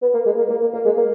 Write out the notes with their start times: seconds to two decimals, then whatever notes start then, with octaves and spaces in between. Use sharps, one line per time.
0.02 B3
0.14 A#3
0.26 G#3
0.38 A#3
0.50 A#3
0.62 A#3
0.74 A#3
0.85 G#3
0.97 A#3